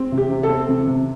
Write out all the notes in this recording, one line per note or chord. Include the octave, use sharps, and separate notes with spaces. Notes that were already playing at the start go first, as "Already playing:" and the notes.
Already playing: C4
C3
G4
C3
A4
C4
C3
C3